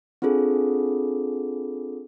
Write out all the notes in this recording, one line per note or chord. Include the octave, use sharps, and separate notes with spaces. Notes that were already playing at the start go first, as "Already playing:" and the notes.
C4 D4 F4 G#4 A4